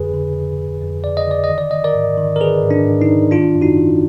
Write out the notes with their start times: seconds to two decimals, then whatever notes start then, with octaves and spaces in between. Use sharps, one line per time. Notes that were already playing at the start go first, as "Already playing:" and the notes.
Already playing: F2 D3 G#4 B4
0.14 D3
0.36 F2
0.58 D3
0.82 F2
1.04 F2 D5
1.17 D#5
1.27 D3 D5
1.44 D#5
1.49 D#3
1.58 D5
1.71 D#3 D#5
1.84 A#4 D5
1.95 G#2
2.17 D#3
2.36 A#4
2.40 D#3 G#4 B4
2.63 G#2
2.71 D4
2.86 G#2
3.02 D#4
3.09 D#3
3.31 D#3 D4 F4
3.55 F#2
3.62 D#4 F#4
3.77 D#3